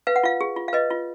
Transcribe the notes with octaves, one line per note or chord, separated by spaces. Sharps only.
B4 F5
F#5
F4 F5
G#4
F4
F5
B4 D#5
F4